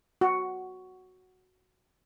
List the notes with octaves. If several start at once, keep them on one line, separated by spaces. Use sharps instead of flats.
F#4